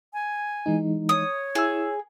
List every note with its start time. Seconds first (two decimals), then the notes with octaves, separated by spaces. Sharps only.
0.13 G#5
0.66 E3 G#3 D#4
1.09 C#5 D#6
1.55 E4 G#4 E6